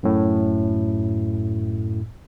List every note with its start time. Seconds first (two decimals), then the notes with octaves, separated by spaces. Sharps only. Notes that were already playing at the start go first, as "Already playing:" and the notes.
0.03 F#2 A2